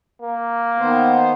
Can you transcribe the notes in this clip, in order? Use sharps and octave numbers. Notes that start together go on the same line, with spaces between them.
A#3
D#3 B3 C5